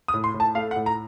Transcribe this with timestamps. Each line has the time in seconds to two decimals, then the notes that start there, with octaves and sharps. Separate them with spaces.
0.08 D#6
0.14 A2
0.24 C6
0.34 A2
0.40 A5
0.55 A3 F5
0.71 F#5
0.76 A2
0.86 A#5